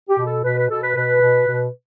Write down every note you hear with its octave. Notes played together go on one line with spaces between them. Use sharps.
G4
B2
A4
B2 B4
B4
B2 A4
B4
B2 B4
B2
B2